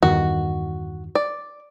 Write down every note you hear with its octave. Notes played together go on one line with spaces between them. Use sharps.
E2 G2 D#3 F#4
D5